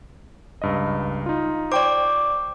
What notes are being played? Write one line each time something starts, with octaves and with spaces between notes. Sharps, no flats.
C#2 G2 D#5
D#4 F4
C5 D5 G5 C#6 D6